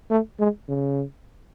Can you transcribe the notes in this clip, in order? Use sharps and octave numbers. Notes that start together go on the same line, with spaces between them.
A3
G#3
C#3